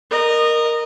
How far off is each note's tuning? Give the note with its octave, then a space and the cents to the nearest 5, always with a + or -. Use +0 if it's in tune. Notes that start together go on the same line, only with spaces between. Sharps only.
A#4 +0 D#5 -20